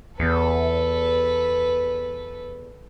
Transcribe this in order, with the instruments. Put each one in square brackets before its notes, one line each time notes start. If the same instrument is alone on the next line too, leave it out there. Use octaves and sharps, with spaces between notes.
[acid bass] E2 [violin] A4 B4